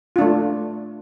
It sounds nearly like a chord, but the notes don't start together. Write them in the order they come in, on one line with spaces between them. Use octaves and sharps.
F4 D4 A3